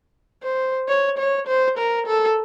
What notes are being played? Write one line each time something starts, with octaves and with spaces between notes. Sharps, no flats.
C5
C#5
C#5
C5
A#4
A4